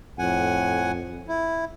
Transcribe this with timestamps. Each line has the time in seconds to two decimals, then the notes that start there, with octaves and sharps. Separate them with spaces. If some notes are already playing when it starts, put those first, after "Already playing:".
0.19 F2 A2 F#5 G#5
1.28 E4